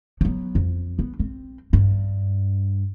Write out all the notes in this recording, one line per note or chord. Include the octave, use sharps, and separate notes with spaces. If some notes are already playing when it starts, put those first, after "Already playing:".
F#3 B3
F2
B3
C4
G2